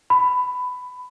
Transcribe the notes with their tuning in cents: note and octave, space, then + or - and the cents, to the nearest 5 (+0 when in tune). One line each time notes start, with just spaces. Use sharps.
B5 +15